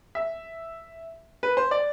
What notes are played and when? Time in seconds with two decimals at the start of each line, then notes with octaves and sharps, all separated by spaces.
0.15 E5
1.43 B4
1.57 C5
1.71 D5